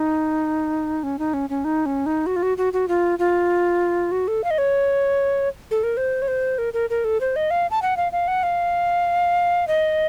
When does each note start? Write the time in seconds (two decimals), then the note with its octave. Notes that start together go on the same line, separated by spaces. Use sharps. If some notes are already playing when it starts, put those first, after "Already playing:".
Already playing: D#4
1.03 C#4
1.19 D#4
1.34 C#4
1.50 C#4
1.65 D#4
1.86 C#4
2.06 D#4
2.26 F#4
2.36 F4
2.43 F#4
2.58 F#4
2.73 F#4
2.88 F4
3.19 F4
4.11 F#4
4.28 A4
4.44 F5
4.51 D#5
4.58 C#5
5.71 A4
5.83 A#4
5.97 C5
6.22 C#5
6.28 C5
6.58 A#4
6.74 A#4
6.90 A#4
7.04 A4
7.21 C5
7.36 D#5
7.51 F5
7.71 A5
7.82 F#5
7.97 F5
8.12 F5
8.28 F#5
8.43 F5
9.68 D#5